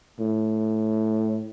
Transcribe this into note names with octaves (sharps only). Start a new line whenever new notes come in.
A2